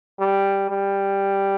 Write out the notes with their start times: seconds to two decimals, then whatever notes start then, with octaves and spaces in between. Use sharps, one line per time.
0.20 G3
0.70 G3